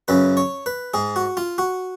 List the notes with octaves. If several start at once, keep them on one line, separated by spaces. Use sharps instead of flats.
F#2 C#3 B4
C#5
B4
G#2 G#4
F#4
F4
F#4